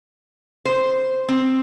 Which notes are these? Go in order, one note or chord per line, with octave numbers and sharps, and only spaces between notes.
C5
C4